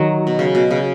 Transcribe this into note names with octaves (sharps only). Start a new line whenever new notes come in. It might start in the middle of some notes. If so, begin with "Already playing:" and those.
Already playing: D#3 F#3
B2
C#3
B2
C#3